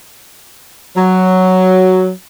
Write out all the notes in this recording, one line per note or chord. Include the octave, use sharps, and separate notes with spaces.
F#3